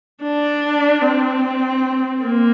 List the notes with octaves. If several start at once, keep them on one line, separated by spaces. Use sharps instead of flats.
D4
C4
A#3